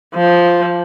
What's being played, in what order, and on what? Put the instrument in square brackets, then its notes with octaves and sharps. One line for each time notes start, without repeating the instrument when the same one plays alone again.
[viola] F3